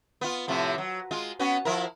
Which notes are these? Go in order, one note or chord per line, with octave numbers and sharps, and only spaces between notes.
B3 F4
A2 C3 F3
F#3
G#3 F4
B3 C#4 F#4
F3 E4 A#4